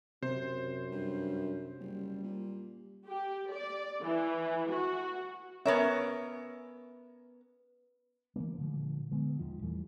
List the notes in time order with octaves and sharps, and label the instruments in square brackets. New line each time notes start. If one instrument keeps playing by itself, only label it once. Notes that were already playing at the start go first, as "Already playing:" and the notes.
[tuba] F#2 [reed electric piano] C3 [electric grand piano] C5
[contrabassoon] G2
[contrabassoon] F#1 [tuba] G3
[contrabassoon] A#2
[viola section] G4
D5
E3
F#4
[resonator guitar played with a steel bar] B3 A#4 E5 [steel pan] C#4 C#5
[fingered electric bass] E3 F#3 A3 A#3
A#2 D3 F3 G#3
D3 G#3 B3
A#1 D#2 D#3 F3
E2 E3 G3 A3